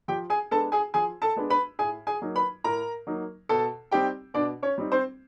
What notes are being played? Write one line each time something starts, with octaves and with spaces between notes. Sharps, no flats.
F3 G4 G5
G#4 G#5
G#3 B3 D4 A4 A5
G#4 G#5
F3 G#4 G#5
A4 A5
G#3 B3 D4
B4 B5
A2 G#4 G#5
G#4 G#5
F#3 A#3 D#4
B4 B5
A2 A#4 A#5
F#3 A#3 D#4
B2 A4 A5
G3 C4 D#4 G4 G5
B2 D4 D5
C#4 C#5
G3 C4 D#4
C4 C5